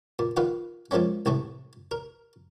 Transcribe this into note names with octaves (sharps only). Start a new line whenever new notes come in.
A#2
D#3 F4 B4 F#5
F3 G#3 A#3 C4 C#4
C2 A2 E3 A3
A#4